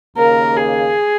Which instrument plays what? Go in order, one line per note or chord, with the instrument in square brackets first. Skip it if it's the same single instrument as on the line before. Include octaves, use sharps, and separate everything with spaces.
[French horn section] D#2 C#3 A#3 [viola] A#4
[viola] G#4